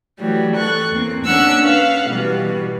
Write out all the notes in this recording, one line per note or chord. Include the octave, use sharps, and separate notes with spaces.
E3 F#3 G3 A3
A4 C#6 F#6
E2 A#3 C4
A#3 C#4 D4 F#5 C#6 E6
B4 F5 F#5
B2 E3 G3 B3